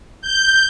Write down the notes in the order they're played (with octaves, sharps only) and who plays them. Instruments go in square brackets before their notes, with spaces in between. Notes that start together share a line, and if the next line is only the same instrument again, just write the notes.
[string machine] G6